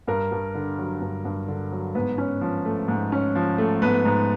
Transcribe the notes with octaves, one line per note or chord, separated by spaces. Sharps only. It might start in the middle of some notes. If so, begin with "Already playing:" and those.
G2 A#4
G2
D3
F#3
G2
G2
D3
F#3
G#2 B3 B4
C#4
F3
A3
G#2
C#4
F3
A3
G#2 B3 B4
G#2